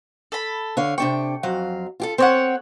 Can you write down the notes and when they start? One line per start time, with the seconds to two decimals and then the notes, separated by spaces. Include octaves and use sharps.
0.32 A4 B5
0.77 D3 C#5 F5
0.98 C3 D4 G5 C#6
1.43 F2 F#3 F5
2.00 F4 G4 A4
2.18 C4 C5 C#5 F#5